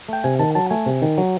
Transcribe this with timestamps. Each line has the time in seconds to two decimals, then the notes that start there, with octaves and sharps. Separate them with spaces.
0.08 A3 G5
0.24 C3 G#5
0.39 D#3 A5
0.55 F#3 A5
0.70 A3 G#5
0.86 C3
1.02 D#3
1.18 F#3